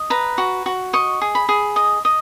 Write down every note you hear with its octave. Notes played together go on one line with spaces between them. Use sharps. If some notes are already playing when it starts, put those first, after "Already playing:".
Already playing: D#5
B4 A#5
F#4
F#4
D#5 C#6
G#4
B5
G#4
D#5
D#5